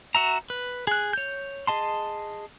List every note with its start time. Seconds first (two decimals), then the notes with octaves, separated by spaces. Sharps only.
0.15 F#4 E5 A#5
0.50 B4
0.87 G#4 F#6
1.13 C#5 G6
1.67 G#4 D#5 A5 C6